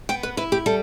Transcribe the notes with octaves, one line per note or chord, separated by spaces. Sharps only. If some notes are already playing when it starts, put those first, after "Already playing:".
B3 G5
B4
E4 B4
G4
G3 A4